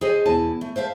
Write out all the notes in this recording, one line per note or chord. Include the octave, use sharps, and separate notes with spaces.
G#4 A4 C5 C#5 D#5 G#5
E2 B2 E4 G#5 A5
A3
C5 E5 F5 A5